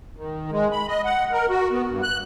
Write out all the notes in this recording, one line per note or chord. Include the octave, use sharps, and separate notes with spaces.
D#3
G#3
B5
D#5
F#5
A#4
F#4
B3
G2
F#6